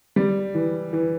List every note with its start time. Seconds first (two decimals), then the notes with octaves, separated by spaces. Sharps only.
0.16 G3
0.55 E3
0.93 E3